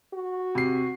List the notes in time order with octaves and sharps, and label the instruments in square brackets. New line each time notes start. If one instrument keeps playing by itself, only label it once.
[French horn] F#4
[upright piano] C3 C7